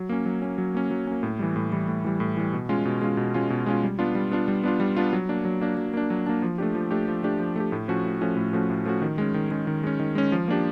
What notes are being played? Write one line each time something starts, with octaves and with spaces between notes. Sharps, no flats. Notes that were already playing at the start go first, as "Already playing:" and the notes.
Already playing: F#3
A#3 C#4
F#3
A#3 C#4
F#3
A#3 C#4
F#3
A#3 C#4
A2
E3 G3
A2
E3 G3
A2
E3 G3
A2
E3 G3
B2
G#3 C#4 F4
B2
G#3 C#4 F4
B2
G#3 C#4 F4
B2
G#3 C#4 F4
G3
B3 D4 F4
G3
B3 D4 F4
G3
B3 D4 F4
G3
B3 D4 F4
F#3
A#3 D4
F#3
A#3 D4
F#3
A#3 D4
F#3
A#3 D4
F3
A3 D4 G4
F3
A3 D4 G4
F3
A3 D4 G4
F3
A3 D4 G4
A2
F3 A3 C#4 F#4
A2
F3 A3 C#4 F#4
A2
F3 A3 C#4 F#4
A2
F3 A3 C#4 F#4
D#3
G#3 C#4
D#3
G#3 C#4
D#3
G#3 C#4
D#3
G#3 C#4
F3
A#3 D4 G4